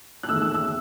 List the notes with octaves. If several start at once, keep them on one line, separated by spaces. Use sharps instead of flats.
F#6
E2 D#3 A3 E6
E6
E6